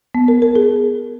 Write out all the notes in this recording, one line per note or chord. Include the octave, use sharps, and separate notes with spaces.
B3
A#4
A#4
G#4